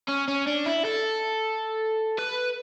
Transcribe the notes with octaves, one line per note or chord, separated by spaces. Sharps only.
C#4
C#4
D4
E4
A4
B4